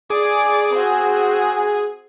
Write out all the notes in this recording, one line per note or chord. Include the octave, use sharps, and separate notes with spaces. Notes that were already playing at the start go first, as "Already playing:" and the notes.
G#4 D5 D6
C4 F#4